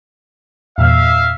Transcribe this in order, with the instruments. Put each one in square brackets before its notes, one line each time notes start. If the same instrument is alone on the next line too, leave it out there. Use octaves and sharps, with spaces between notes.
[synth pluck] E2 G2 A#2 [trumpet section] E5 F5